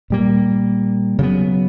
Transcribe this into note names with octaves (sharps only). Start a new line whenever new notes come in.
A#2 G3 A#3
C#3 F#3 B3